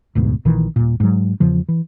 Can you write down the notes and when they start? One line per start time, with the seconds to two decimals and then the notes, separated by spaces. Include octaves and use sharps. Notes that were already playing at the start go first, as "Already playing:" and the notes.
0.15 F1 D2 G#2 B2
0.45 A#1 A#2 D#3 E3
0.76 D#1 A#2
1.00 G#2 F#3
1.40 E2 C#3 F3
1.69 E3